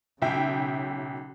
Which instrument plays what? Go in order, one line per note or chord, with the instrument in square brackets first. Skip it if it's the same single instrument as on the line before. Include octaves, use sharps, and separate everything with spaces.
[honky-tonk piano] B1 E5 G5 [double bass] C#3